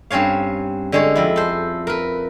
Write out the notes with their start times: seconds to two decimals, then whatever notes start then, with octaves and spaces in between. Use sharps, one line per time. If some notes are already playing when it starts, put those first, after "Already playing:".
0.10 G2 C4 C#4 C#5 F5
0.92 D3 G#3 C#5
1.16 F2 E4
1.36 A4 C5
1.87 A#4 B4